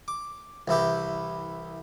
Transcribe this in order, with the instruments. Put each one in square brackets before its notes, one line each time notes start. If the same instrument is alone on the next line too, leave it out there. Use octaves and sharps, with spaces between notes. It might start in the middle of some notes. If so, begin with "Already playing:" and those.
[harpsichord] D6
C2 E3 E4 G4